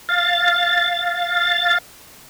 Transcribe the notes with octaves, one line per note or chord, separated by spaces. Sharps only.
F5 A6